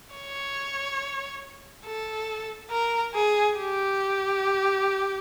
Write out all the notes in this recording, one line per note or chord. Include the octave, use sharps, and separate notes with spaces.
C#5
A4
A#4
G#4
G4